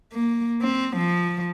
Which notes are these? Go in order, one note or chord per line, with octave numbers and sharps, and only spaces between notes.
A#3
C4
F3